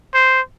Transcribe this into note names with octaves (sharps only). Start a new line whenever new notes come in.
C5